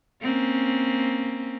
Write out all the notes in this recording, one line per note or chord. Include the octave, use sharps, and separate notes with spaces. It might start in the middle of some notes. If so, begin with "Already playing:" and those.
A#3 C4 C#4